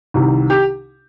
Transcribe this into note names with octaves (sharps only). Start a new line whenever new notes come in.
C2 C3 D#3
G4